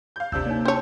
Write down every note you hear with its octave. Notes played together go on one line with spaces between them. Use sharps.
F5 G6
G1 D2 C3 D4 E6 G6
A#3 D#4 C#5 D5
C#4 C5 C#5 A5